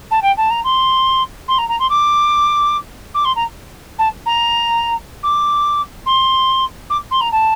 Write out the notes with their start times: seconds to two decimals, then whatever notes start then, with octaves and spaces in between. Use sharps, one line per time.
0.10 A5
0.22 G5
0.37 A5
0.50 A#5
0.64 C6
1.48 C6
1.58 A#5
1.68 A#5
1.79 C6
1.89 D6
3.14 D6
3.24 C6
3.35 A#5
3.98 A5
4.25 A#5
5.23 D6
6.06 C6
6.89 D6
7.11 C6
7.20 A#5
7.32 A5